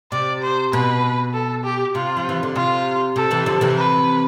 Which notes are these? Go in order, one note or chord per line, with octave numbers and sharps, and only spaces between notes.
C3 D5
C5
B2 B4
A4
G4
C3 F4
F3
E3
D3
C3 F4
C3 A4
C3 E3
D3 F3
C3 E3
B4